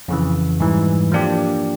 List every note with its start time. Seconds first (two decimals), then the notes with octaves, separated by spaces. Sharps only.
0.08 F2 C#3 E3
0.60 G#2 E3 G3
1.12 F3 A#3 D4 G4